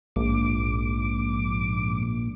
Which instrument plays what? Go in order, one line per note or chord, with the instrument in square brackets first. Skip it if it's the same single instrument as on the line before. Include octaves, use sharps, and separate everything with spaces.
[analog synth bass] A#1 [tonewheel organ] G#2 D6